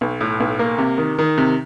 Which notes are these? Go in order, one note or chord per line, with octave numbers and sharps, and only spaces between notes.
B1
A2
B1
A#3
C3
D#3
D#3
C3